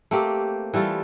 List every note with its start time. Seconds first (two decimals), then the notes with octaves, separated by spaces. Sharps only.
0.11 A3 A#3 C4 G4
0.74 E3 G3 A3 F4